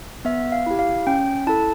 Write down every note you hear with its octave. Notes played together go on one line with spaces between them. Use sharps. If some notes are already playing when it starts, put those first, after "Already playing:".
B3 E5
F5
E4 G4
F5
C#4 G5
E4 A4 A5